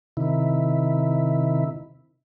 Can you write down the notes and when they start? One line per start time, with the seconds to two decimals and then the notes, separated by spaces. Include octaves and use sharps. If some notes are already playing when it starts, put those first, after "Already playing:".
0.17 C3 D#3 E4